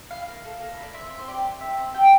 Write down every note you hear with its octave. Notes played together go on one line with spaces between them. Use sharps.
E4 F5
A#3
A4
A#3
E4
D5
C4 E5
C4
C5
G4 D5
G4
C4 E5
C4
G4 G5